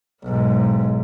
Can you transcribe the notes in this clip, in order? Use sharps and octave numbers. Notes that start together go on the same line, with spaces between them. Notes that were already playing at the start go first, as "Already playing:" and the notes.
B1 G#2